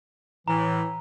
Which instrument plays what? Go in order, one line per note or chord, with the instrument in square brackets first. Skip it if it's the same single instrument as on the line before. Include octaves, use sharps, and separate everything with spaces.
[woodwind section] A2 E3 [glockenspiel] A#5